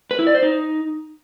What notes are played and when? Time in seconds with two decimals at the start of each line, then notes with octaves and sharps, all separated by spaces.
0.11 B4
0.19 E4
0.27 D5
0.35 C5
0.43 D#4